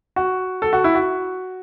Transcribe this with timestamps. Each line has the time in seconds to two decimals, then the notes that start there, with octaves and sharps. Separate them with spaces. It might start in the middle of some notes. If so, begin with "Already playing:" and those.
0.16 F#4
0.62 A4
0.73 F#4
0.84 E4
0.95 F#4